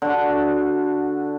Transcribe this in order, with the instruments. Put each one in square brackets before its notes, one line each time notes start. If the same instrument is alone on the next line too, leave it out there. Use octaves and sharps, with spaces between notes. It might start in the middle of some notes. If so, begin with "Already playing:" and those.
[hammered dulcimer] D3 F#4